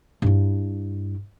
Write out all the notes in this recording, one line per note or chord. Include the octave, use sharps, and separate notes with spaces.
G2 E4